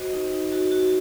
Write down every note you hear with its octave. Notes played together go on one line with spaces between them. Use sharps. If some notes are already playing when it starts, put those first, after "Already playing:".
Already playing: F#4 C5 D#5
D#4
D#4
F#4
F#4